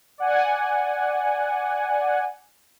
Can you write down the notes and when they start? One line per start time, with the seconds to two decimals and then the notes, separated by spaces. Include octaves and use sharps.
0.18 D5 F#5 G#5